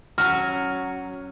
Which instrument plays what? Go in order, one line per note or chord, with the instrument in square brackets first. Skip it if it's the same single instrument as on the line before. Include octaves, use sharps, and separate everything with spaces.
[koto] F#3 C#4 F#4 [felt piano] F6